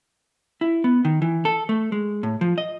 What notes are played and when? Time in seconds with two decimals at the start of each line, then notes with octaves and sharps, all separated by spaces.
0.61 E4
0.84 B3
1.05 D#3
1.22 E3
1.45 A4
1.69 A3
1.92 G#3
2.23 A2
2.41 F3
2.58 D#5